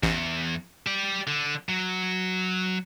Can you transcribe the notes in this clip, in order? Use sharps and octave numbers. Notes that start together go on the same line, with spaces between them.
A1 E2
G4 D5
D3
F#3